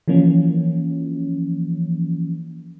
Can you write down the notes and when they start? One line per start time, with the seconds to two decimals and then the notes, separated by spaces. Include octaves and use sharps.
0.08 E3 F3 A#3 C#4